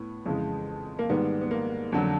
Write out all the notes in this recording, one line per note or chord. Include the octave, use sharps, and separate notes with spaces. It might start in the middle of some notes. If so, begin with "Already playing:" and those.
Already playing: A2 B3
F2 C#3 E3 G#3
A#3
G#2 D#3 G3 B3
B3
A#3
F2 D3 F#3